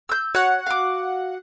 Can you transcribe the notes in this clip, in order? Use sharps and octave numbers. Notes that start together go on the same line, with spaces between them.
E6 G6
F#4 C#5 F#5
F5 D6